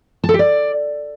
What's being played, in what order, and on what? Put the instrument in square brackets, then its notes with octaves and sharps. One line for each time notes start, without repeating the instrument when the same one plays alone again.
[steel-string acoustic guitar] A5
A4
G4
D5